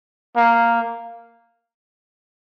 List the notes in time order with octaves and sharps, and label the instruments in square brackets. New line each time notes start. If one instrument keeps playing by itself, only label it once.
[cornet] A#3